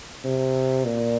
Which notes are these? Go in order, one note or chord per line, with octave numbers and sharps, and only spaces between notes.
C3
A#2